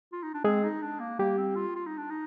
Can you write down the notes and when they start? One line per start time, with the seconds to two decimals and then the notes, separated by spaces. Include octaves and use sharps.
0.13 F4
0.23 D#4
0.34 D4
0.44 G#3 C4 G#4
0.64 D#4
0.82 D4
1.00 A#3
1.19 G3 A#3 G4
1.38 C4
1.56 F4
1.76 F4
1.86 D#4
1.98 D4
2.10 D#4